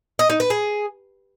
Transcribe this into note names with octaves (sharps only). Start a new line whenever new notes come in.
D#5
D#4
B4
G#4